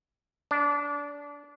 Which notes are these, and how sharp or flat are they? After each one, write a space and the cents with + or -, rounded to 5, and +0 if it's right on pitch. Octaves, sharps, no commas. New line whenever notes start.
D4 -25